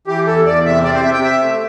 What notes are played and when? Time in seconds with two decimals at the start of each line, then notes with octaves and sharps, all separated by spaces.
0.07 E3 G4
0.27 E2 A4
0.46 E2 D5
0.65 C3 E5
0.84 C4 D5
0.94 C5
1.03 C3 E5
1.13 G5
1.23 C3 E5
1.42 A3